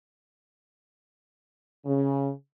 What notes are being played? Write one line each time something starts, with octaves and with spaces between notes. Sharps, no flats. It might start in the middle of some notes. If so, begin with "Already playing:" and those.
C#3